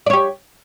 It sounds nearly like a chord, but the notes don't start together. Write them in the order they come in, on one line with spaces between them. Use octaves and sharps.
D5 C#5 G4